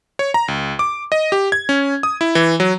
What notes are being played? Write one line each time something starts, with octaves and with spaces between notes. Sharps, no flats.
C#5
A#5
C#2
D6
D#5
G4
G#6
C#4
D#6
E4
E3
F#3